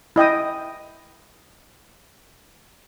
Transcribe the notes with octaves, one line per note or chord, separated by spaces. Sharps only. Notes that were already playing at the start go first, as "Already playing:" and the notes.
E4 D#5 G5 D#6